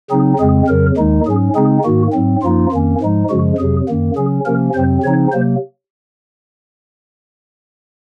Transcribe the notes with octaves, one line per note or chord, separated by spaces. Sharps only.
C#3 F#3 C4 D#4 G#4
F2 C#3 G#3 C4 G#4
F2 C#3 F#3 A#4
D#2 D#3 G#3 D#4
G#2 F#3 C#4 G#4
C#3 G#3 C4 D#4 G#4
G#2 D#3 A#3 F#4
G#2 F#3 C4
F#2 F3 A#3 D#4 F4
F2 D#3 A#3 C#4
G#2 F3 G#3 D#4
F#2 C#3 F3 G#3 F#4
F2 C3 F#3 G#4
F#2 D#3 A#3
C#3 F#3 C#4 G#4
C3 F3 A#3 C#4 A#4
F2 C3 F#3 C4 C5
C#3 F3 C4 D#4 C#5
C3 F#3 A#3 C5